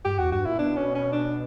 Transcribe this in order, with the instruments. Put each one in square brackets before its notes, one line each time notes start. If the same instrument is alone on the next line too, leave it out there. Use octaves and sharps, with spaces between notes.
[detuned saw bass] G2 [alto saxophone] G4
[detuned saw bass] E2 [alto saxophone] F#4
[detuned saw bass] G2 [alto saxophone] F#4
[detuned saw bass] A#2 [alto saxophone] E4
[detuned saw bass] B2 [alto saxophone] D4
[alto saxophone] C#4
C#4
D4